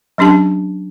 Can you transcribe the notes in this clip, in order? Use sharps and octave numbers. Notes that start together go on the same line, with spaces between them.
F#3 C#4 D4 G4 A5